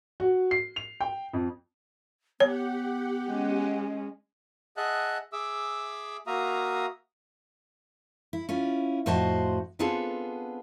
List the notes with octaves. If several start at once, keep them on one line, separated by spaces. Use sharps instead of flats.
F#4
C7
F7
G5
F2
B3 G4 C#5 F#5
G#3 C#4
G#4 D#5 E5 F#5 A5 F#6
G#4 E5 D6 E6
A#3 F#4 E5 F5 A#5 D#6
E4
C#4 E4 F4
F2 A2 F#4 C5 D#5 A5
B3 C4 D4 F4 G#4 A4